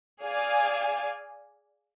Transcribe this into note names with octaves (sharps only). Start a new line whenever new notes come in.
G#4 D5 F5 G#5